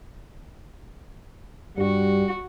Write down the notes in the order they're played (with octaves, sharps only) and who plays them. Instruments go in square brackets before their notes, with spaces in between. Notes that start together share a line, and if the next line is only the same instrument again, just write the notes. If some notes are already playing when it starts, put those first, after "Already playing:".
[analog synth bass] G2 [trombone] G3 [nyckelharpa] F#4